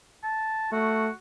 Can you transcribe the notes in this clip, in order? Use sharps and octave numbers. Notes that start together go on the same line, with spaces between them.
A5
A3 F#4